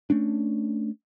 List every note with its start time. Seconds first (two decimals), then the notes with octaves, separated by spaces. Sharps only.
0.10 A3 C#4 D4